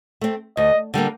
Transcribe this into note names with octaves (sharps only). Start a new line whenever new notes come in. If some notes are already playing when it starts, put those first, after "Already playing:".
A3 C4
D2 D#5
D3 G3 A#3